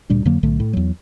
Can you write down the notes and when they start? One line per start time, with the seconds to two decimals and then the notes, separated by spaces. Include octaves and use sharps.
0.10 D2 A#2 G3 D4
0.25 F2 D3 F#3 A#3
0.43 B1 A2 D3 A3
0.60 A2
0.73 E2 F#3